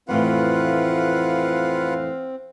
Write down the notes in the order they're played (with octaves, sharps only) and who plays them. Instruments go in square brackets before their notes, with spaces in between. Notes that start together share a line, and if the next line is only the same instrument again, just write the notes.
[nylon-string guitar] F2 A2 E3 [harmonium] C4 [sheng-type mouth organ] F4 B4 F#5 [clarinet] F5